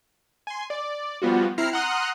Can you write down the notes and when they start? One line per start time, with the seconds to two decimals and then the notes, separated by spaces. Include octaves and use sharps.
0.47 G#5 C6
0.70 D5
1.22 F3 G3 B3 F4 F#4
1.58 C4 E4 A#5 F6 C7
1.73 F#5 A#5 C6 D#6 F6 F#6